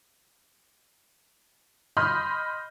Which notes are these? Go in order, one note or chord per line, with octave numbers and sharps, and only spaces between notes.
D#5 B5 C6 F6 G6